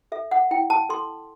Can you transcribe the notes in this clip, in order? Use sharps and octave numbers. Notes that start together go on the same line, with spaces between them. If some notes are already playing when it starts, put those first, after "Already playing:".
A4 E5
F#5
E4 G5
A5
A4 C6